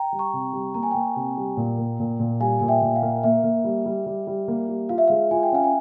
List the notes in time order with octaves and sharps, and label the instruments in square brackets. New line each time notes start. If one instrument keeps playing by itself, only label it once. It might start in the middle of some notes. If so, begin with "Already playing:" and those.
Already playing: [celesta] G5 A#5
[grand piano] G3
[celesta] A#5 C#6
[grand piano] C3
G3
[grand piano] A#3 [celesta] A#5
[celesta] G#5
[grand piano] A#3 [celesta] G5 A#5
[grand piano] C3
G3
A#2
A#3
A#2
A#2
[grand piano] G3 [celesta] F5 G#5
[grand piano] A#2 [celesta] G#5
[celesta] E5 G5
[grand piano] A#2
[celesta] F5
[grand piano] A#3
[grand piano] A#3 [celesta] E5
[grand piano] A#3
G3
G3
G3
G3
A#3
G3
[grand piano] F4 [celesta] F5
[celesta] E5
[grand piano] G#3 [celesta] F5
[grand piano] F4 [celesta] G#5
[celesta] G5
[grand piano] C#4 [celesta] F5 G#5
[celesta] G#5